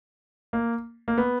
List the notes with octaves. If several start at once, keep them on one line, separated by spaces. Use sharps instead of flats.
A#3
A#3
B3